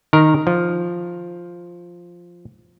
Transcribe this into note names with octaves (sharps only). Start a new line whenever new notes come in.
D#3 A#4
F3